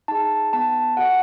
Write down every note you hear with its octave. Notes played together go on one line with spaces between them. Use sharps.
D#4 G#4 A5
B3 A5
F#4 A4 F#5